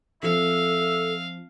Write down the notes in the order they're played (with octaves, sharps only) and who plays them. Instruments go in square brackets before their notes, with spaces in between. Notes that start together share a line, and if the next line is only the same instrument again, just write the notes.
[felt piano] F3 C4 [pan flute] A4 [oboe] E5 [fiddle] F5